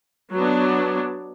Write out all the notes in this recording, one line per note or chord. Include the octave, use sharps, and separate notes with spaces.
F#3 B3 D4